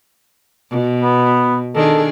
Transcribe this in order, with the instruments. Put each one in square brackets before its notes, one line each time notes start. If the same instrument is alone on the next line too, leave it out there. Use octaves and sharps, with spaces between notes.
[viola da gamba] B2
[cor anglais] B3
[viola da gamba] D#3 D4 G#4 [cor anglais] A4